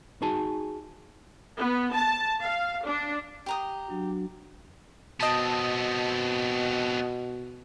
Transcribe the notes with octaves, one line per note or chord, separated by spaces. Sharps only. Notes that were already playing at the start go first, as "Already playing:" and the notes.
D#4 F#4 G#4 G#5 A5
B3
A5
F5
D4
G4 A#5 D#6
F#3 D4 F#4
B2 B3 C4 D#5 A5